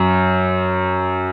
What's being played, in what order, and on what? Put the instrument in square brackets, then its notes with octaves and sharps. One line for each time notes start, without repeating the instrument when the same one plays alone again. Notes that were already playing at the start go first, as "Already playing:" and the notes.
Already playing: [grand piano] F#2